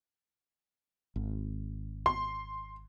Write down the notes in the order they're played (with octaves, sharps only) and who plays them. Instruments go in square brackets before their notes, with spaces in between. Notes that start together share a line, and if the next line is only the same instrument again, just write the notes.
[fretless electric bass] G#1
[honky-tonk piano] C6